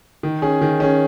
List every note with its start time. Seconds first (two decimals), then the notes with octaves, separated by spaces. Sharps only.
0.23 D#3
0.42 C#4 G#4
0.61 D#3
0.80 C#4 G#4